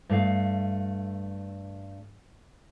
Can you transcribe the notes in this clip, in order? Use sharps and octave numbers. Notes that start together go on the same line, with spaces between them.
G2 A3 F5